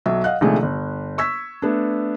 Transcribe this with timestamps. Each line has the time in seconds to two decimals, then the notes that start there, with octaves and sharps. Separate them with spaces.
0.06 B1 F#3 E5
0.24 D#5 F5 F#5 F#6
0.41 A#1 C3 D#3 G#3 A3 G#4
0.62 G1
1.18 C#6 E6 G#6 B6
1.62 A3 B3 D4